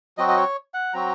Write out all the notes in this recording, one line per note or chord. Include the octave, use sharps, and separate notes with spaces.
F#3 C4 F#4 D#5
D#5
C#5
F#5
F#3 C4 F#4 A#5